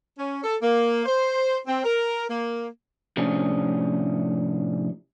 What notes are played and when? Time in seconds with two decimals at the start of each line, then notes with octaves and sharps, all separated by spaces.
0.18 C#4
0.44 A4
0.61 A#3
1.06 C5
1.66 C4
1.84 A#4
2.29 A#3
3.17 A2 C3 F3 C#4 D4 G#4